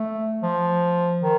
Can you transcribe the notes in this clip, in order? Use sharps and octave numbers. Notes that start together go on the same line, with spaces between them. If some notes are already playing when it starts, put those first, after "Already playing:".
Already playing: A3
F3
D#3